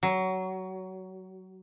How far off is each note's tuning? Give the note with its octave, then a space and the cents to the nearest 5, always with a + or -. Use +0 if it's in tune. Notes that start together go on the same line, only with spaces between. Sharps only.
F#3 +20